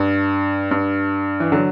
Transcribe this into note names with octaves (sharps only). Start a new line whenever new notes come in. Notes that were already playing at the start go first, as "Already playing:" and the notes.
Already playing: G2
G2
E3
D3 F#3